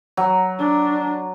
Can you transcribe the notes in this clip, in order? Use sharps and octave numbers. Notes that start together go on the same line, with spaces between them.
F#3
D4